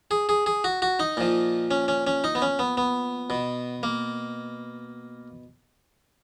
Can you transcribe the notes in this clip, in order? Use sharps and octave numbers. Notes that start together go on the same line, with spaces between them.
G#4
G#4
G#4
F#4
F#4
D#4
A#2 F3
C#4
C#4
C#4
D#4
B3
C#4
B3
B3
B2
A#3